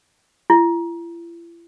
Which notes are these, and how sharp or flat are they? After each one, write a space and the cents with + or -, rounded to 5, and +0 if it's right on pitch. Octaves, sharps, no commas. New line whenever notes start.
E4 +45